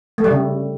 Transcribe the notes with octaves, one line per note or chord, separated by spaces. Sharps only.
A3
G3
C#3